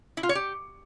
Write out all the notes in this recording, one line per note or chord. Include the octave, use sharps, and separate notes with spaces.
E4
F4
C#5
G4